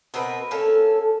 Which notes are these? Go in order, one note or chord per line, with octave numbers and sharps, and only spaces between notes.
B2 C4 A#4 B4
A#3 C#4 A4